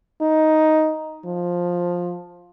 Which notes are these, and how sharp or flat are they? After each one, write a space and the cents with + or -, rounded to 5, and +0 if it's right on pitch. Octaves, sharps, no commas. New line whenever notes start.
D#4 +5
F3 +10